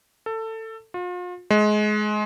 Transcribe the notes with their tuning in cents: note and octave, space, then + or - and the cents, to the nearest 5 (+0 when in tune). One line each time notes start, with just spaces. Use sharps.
A4 +20
F4 +40
G#3 +25